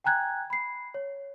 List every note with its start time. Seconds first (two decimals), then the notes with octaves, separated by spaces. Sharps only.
0.04 G5 G#5 A#5 F#6 G#6
0.50 B5 C7
0.94 C#5